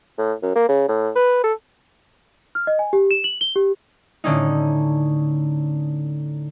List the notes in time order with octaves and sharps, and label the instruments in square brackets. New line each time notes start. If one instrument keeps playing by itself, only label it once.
[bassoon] A2
F#2
A#3
C#3
A2
B4
A4
[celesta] F6
D#5
G#5
G4
E7
F#7
G7
G4
[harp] A2 D3 C#4 D#4